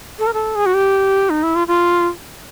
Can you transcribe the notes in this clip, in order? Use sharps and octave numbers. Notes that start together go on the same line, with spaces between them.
A4
A#4
A4
G#4
F#4
G4
D#4
E4
F4
F4